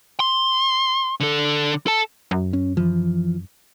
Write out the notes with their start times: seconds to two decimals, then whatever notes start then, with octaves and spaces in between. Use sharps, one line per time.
0.20 C6
1.20 D3 A4
1.87 A4 A5
2.31 F#2
2.53 C#4
2.77 E3 F3